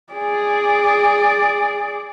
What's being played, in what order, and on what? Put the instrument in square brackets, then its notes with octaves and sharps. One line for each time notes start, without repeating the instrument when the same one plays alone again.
[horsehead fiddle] G#4 D5